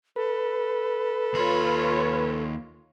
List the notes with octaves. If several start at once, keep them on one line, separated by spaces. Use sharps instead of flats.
A4 B4
D#2 F4 C#5 B5